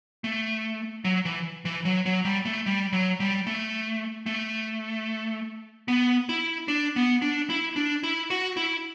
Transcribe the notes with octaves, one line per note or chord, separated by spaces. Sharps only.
A3
F#3
E3
E3
F#3
F#3
G3
A3
G3
F#3
G3
A3
A3
B3
E4
D4
B3
D4
E4
D4
E4
F#4
E4